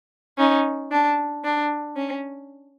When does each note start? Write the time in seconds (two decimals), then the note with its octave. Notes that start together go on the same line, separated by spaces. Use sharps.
0.38 C#4 D#4
0.91 D4
1.44 D4
1.96 C#4